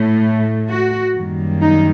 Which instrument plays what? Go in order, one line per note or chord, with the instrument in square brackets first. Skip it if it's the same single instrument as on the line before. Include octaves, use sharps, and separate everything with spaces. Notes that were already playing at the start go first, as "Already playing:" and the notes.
Already playing: [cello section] A2 A3
F#4
F#2 D#3 G3 A#3
D#4